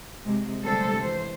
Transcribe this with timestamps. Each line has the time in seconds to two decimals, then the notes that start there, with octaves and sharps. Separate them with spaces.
0.24 C3 G#3
0.63 D2 C3 G3 G#3 A4 C5
1.00 E3 C5